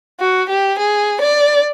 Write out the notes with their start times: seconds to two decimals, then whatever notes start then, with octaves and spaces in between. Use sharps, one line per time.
0.20 F#4
0.49 G4
0.79 G#4
1.21 D5